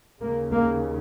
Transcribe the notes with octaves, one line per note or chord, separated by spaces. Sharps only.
D#2 C#3 A#3
A#3